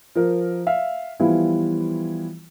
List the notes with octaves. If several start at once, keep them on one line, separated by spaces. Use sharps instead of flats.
F3 A#4
E5 F5
E3 F3 G3 B3 E4 F4